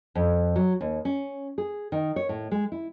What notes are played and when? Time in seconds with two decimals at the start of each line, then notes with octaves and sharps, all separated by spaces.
0.15 F2
0.56 F#3
0.81 D#2
1.05 C#4
1.58 G#4
1.92 D#3
2.16 C#5
2.29 A2
2.51 G#3
2.72 E4